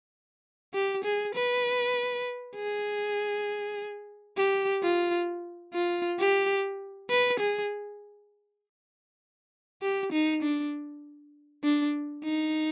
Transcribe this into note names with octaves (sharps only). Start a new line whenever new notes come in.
G4
G#4
B4
G#4
G4
F4
F4
G4
B4
G#4
G4
D#4
D4
D4
D#4